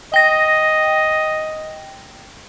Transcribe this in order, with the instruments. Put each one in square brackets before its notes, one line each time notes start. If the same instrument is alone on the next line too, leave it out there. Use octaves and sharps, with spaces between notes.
[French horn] D#5 [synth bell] G5 A#6